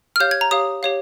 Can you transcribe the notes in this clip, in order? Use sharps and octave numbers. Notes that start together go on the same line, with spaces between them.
F6
G4 C#5 F5 G6
G#6
A#5
G4 C#5 F5 D#6
G4 C#5 F5